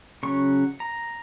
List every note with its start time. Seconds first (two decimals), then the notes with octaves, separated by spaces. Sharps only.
0.23 C#3 F#3 C#4 C#6
0.80 A#5